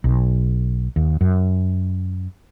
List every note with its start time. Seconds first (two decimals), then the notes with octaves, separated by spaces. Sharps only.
0.04 B1
0.96 D#2
1.21 F#2